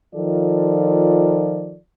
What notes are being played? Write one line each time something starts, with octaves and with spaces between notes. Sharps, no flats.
D#3 F3 F4 A4 D5